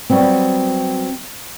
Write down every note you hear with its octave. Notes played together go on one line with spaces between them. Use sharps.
F#3 G3 B3 C4